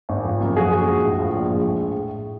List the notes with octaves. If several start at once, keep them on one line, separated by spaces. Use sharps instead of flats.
G#1
F3
F#2
F3 F#4 G#4
A#1
G#3
A2
F3
A#1
G#3
A2